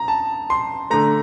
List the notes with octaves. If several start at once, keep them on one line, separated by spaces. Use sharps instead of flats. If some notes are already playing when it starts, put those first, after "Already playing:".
Already playing: A#5
A5
C6
D3 A3 A#5